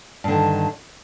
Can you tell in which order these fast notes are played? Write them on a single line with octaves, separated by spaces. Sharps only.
G2 D3 D#3